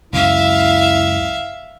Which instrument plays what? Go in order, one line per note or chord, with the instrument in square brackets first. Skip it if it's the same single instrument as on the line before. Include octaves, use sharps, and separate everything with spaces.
[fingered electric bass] C#2 F#2 [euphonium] E4 [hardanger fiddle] E5 F5